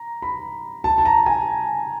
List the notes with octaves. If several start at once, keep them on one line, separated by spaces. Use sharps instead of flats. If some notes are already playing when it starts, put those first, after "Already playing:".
Already playing: A#5
B5
A5
A5
A#5
G#5